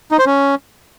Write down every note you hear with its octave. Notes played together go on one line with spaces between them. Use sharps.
D#4
C5
C#4